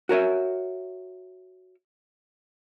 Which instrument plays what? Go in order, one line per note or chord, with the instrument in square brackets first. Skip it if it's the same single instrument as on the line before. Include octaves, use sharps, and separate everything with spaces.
[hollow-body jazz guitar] F#4 A#4 C#5 E5